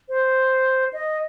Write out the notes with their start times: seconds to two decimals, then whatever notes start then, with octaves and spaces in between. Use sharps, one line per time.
0.09 C5
0.93 D#5